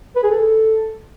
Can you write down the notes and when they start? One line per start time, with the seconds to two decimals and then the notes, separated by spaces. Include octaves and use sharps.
0.16 B4
0.23 G#4
0.31 A4